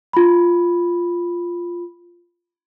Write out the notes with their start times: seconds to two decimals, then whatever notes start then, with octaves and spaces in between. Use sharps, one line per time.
0.13 F4 B5